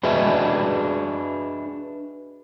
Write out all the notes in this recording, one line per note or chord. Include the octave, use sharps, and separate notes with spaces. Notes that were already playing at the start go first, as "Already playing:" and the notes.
D4 F#4 G#4 B4 D#5 E5